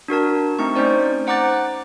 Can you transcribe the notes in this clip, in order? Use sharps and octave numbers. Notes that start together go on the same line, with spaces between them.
D4 F#4 A#4 A5
A3 C4 D#4 C#6
C#4 D#4 C5 D5
C5 F#5 A#5 D6 F#6 A6